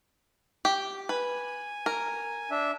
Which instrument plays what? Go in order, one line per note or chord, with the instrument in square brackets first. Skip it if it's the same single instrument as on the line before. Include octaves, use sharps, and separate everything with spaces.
[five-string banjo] G4
[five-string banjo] B4 [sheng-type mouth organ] G#5
[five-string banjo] A#4
[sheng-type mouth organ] D4 E5